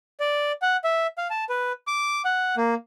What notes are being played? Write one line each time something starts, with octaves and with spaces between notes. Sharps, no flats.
D5
F#5
E5
F5
A5
B4
D6
F#5
A#3